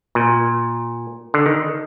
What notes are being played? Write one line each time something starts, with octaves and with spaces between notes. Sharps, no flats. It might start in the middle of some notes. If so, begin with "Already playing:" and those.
A#2
D3
D#3